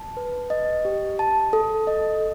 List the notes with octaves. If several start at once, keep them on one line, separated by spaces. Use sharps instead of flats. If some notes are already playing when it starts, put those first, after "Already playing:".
Already playing: A5
B4
D#5
G4
A5
A4
D#5